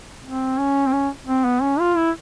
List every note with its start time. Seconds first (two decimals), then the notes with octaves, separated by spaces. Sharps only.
0.24 C4
0.58 C#4
0.87 C4
0.93 C#4
1.27 C4
1.45 B3
1.62 C#4
1.80 F4
1.97 E4